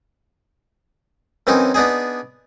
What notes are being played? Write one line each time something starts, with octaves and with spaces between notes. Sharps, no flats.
F#2 E3 C4 C#4 D#4
B3 D4 D#4 G#4